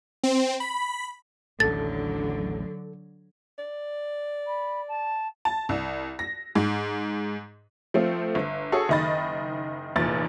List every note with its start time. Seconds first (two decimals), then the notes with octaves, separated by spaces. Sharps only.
0.23 C4
0.60 B5
1.60 A1 D#2 A2 D3 F#3 A4 A6
3.58 D5
4.47 B5
4.88 A5
5.45 A5
5.69 C2
6.19 A#6
6.55 G#2
7.94 F3 A3 C4 F4
8.35 G1
8.72 F#4 G#4 A4 C#5
8.89 F#1 D#3 D#5 B5 A6
9.96 F1 E2 A#2 A6